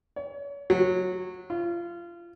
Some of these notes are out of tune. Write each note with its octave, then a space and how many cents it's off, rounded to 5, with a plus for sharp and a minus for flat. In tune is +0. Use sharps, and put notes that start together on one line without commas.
C#5 +35
F#3 -15
F4 -25